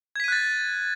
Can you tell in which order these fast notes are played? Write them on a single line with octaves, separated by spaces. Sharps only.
G#6 B6 D#7 F#6 A6